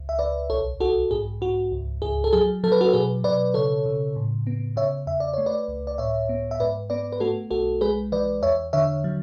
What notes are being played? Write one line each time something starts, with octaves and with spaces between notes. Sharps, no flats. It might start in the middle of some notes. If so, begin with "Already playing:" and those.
Already playing: C#2
E5
C#2 B4 D5
B1 A4 C#5
B1 F#4 A4
G#2 G#4
G#2 F#4
C#2
C#2 G#4
A4
F#3 G#4
F#3 A4
B4
F#4 A4
B2 G#4 B4
B2 B4 D5
C#3 A4 C#5
C#3
A2
B3
C#3 C#5 E5
E2 E5
D5
A3 C#5
B4 D5
C#2
D5
A2 C#5 E5
B3
E5
G#2 B4 D5
B3 B4 D5
B4
A3 F#4 A4
B1 F#4 A4
G#3 G#4 B4
E3 B4 D5
E2 C#5 E5
D3 C#5 E5
F#3